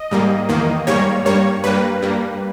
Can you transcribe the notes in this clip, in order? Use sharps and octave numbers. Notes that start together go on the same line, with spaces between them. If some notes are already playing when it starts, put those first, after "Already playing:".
Already playing: D#5
G#2 G3 A#3
E2 D#3 A#3
G#2 G3 A#3 C#5
G2 G3 A#3 C#5
G2 G3 A#3 B4
G2 G3 A#3